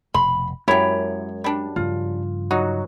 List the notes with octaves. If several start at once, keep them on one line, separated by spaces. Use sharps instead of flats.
F1 B2 B5 C6
F#2 G#3 E4 G4 C#5 A#5
G3 D4
G2 C#3 F3 F4
F#3 D#4 F#4